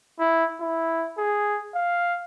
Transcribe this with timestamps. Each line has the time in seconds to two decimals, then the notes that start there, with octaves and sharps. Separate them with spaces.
0.20 E4
0.61 E4
1.18 G#4
1.75 F5